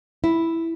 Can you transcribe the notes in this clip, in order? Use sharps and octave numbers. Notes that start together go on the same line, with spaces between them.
E4